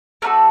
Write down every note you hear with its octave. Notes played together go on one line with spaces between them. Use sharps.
A3 D4 F#4 A4 A#4